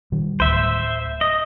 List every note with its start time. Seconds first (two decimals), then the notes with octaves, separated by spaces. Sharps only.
0.12 D#3 G3
0.40 D1 D2 C5 E5
1.21 D#5